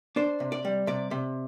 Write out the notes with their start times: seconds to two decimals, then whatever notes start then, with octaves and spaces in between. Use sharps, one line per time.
0.16 D4 C5
0.40 C3
0.52 D5
0.65 G3
0.87 C3 D5
1.11 C3